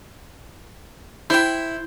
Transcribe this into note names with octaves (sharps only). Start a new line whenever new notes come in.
E4 C5 G5